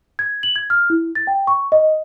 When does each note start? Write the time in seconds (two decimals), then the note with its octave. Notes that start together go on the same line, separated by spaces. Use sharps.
0.19 G#6
0.43 F#7
0.56 G#6
0.70 F6
0.90 E4
1.15 A6
1.27 G5
1.47 C#6
1.72 D#5